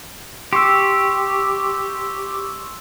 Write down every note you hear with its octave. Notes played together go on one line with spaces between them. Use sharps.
G4 C6 C#6 E6